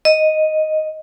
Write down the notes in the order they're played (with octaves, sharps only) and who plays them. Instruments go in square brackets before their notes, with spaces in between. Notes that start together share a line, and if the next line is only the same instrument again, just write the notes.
[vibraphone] D#5